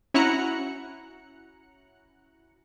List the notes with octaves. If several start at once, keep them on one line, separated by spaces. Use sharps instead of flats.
C#4 E4 F#4 A#5 F#6 C#7